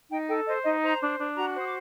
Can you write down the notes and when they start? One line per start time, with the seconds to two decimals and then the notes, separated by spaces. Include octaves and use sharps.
0.10 D#4 G5
0.28 A4 G5
0.46 C5 D#5
0.65 D#4 D#5
0.82 C5 A#5
1.01 D4
1.19 D4
1.37 F#4 A#5
1.55 C5 D#6
1.64 D6